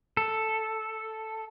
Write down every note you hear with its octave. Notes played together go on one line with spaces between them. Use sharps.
A4